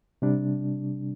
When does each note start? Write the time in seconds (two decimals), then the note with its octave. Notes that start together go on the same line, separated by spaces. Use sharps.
0.22 C3 G3 D4